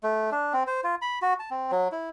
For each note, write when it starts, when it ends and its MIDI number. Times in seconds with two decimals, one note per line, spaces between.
0.03 0.30 57
0.32 0.53 62
0.53 0.63 60
0.67 0.81 72
0.84 0.95 65
1.02 1.19 83
1.22 1.34 66
1.39 1.50 81
1.51 1.71 60
1.71 1.88 54
1.92 2.10 64